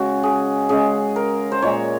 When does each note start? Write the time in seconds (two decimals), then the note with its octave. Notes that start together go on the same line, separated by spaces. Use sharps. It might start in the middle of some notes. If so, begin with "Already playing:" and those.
Already playing: C#3 G#3 F#4
0.23 G#4
0.69 C#3 G#3 G#4
1.16 A#4
1.52 C5
1.62 A#2 G#3 C#5